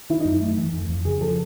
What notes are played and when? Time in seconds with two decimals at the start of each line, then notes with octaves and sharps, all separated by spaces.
0.10 D#3 E4
0.20 D#4
0.25 F#2
0.41 A3
0.58 E3
0.73 F2
0.89 F2
1.05 C#3 G#4
1.21 F3 A4